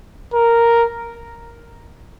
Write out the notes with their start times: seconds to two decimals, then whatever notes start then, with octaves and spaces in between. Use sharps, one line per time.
0.34 A#4